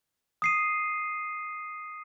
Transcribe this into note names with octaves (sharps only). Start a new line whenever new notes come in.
D#6 C7 D#7